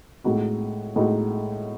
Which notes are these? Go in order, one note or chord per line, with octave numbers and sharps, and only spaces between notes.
A2 G#3 D#4 F#4
A2 G#3 D#4 F#4